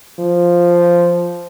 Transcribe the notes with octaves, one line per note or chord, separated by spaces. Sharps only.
F3